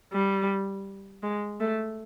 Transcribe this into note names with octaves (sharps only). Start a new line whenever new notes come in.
G3
G#3
A3